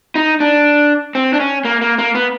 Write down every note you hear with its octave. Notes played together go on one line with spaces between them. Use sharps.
D#4
D4
C4
D4
C#4
A#3
A#3
A#3
B3